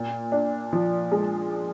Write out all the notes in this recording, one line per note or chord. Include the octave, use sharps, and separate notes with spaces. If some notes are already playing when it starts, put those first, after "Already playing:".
Already playing: A#2
D4
F3
G#3